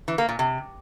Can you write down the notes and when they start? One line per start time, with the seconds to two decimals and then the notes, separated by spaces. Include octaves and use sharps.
0.08 E3
0.18 A#3
0.29 A#2
0.39 C3